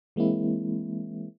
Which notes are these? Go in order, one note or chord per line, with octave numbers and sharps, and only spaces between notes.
E3 G#3 A#3 C4 E4